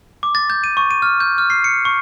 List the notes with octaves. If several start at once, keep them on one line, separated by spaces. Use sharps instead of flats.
D6
A6
G6
D#7
C#6
D#7
F6
G6
F6
C7
C#7
C#6